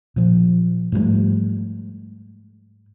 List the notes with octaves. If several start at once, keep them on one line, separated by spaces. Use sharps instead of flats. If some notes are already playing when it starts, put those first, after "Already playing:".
A#2 F3
G#2 F3 G3 A3